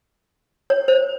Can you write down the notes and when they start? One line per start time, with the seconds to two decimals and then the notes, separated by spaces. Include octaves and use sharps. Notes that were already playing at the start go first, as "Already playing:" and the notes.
0.70 C#5
0.88 C5